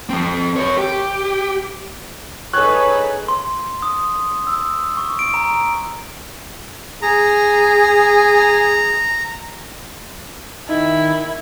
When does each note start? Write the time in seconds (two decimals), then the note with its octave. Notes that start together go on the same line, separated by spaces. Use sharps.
0.09 F3 C4
0.56 A#4 C#5
0.78 G4
2.53 D#4 G#4 A4 B4 C#5 C#6 F#6
3.28 C6
3.82 D#6
4.47 E6
4.97 C#6
5.19 D7
5.34 A#5
7.02 G#4 A#5
10.69 D#3 E4